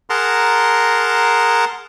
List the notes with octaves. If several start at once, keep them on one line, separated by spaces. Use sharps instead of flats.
G#4 A#4 F#5 A5 A#5 C6